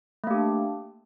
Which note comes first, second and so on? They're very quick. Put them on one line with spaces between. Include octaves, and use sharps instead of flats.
A3 A#3 G4 D4